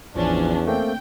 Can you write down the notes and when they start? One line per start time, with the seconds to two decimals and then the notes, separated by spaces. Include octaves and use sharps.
0.16 A1 E2 F3 C#4 D4
0.67 A3 A#3 C4 G5